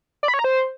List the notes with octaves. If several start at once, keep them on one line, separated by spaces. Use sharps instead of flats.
D5
B5
C#5
A#5
C5